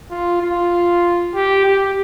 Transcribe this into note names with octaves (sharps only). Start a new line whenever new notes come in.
F4
F4
G4
G4